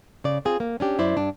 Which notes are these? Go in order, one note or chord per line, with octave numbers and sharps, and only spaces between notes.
C#3 D5
C4 F4 G#4
A#3
C#4 D4 G4
F#2 E4 C5 D5
G2 D4